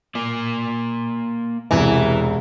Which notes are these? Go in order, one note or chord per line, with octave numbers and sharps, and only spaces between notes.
A#3 D5
E1 C2 E3